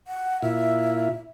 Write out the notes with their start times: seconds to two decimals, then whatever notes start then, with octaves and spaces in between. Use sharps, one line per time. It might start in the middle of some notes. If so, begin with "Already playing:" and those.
0.07 F#5
0.42 A#2 E4 F4 E5